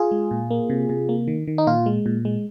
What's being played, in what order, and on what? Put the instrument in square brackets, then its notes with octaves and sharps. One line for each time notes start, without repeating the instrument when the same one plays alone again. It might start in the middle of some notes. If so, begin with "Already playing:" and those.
Already playing: [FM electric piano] F4 G#4
G#3
A#2
A#3
C3
C3
A#3
D#3
D#3
D#4
A#2 F4
G#3
A#2
G#3